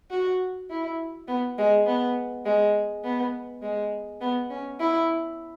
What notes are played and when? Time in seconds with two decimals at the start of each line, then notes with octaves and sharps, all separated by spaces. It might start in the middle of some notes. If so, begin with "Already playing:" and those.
0.10 F#4
0.70 E4
1.28 B3
1.58 G#3
1.86 B3
2.45 G#3
3.04 B3
3.62 G#3
4.21 B3
4.50 C#4
4.80 E4